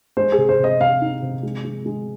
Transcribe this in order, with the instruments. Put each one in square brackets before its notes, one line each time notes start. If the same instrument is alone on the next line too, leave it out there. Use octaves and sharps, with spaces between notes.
[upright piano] G#3 [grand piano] C5
[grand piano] G#4
[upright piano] C3
[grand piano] C5
[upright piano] C3 [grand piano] D#5
[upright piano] C3 [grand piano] F5
[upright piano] D#4
C3
G#3
G#3
G#3